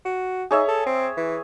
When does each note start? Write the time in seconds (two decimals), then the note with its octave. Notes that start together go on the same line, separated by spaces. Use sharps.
0.05 F#4
0.51 D#4 G#4 C#5 E5
0.68 A4
0.86 C4
1.17 E3